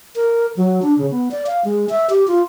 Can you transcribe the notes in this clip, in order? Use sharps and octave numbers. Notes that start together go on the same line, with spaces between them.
A#4
F#3
D4
C#3
B3
D5
F5
G#3
E5
G4
F4